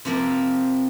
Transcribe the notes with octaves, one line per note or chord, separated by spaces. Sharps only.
C3 F3 A#3